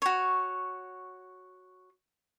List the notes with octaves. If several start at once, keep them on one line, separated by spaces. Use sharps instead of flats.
F#4 C#5